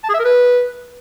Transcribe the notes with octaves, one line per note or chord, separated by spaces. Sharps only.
A5
G#4
E5
A#4
B4